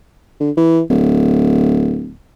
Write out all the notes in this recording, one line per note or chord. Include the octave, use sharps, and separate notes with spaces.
D3
E3
D1